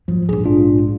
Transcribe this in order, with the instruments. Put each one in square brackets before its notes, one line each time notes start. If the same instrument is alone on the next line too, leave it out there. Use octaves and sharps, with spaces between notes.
[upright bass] G#2 [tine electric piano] F3 F#3
[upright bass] A#1 G#2 [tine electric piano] G#4
[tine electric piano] D4 F4